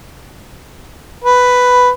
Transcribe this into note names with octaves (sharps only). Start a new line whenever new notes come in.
B4